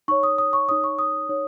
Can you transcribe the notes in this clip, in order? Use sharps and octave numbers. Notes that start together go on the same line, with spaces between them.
D#4 C#5 C#6
D#6
D#6
C#6
D#4 C#5 D#6
C#6
D#6
D#4 C#5